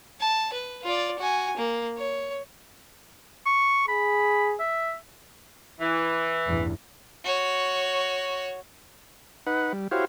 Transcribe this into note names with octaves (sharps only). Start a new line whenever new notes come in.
A5
B4
F4 D5
F#4 G#5
A#3
C#5
C#6
G#4 B5
E5
E3
A1 E2 G2
F#4 C#5
D#4 B4 F#5
G3
E4 F#4 G4 C5 C#5 F5